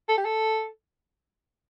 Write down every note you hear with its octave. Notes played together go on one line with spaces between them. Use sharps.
A4
G4
A4